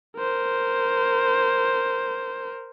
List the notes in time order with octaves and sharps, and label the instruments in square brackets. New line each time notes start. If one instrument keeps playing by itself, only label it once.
[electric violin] A#4 C5